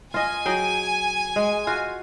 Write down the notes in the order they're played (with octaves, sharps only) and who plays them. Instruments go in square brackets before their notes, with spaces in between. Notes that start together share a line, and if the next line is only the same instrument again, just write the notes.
[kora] F4 D#5 [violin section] G#5
[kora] F#3 G#4 G5
G#3
F4 F#4